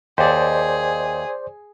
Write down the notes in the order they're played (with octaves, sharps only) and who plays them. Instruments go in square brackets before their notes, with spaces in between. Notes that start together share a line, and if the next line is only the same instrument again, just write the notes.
[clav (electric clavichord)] D#2 [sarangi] G#4 [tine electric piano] C5 D5